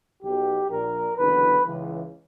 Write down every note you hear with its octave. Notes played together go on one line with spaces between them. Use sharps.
B1 B2 G4
A#1 A#2 A#4
F#1 E2 D3 B4
C#2 C#3 E3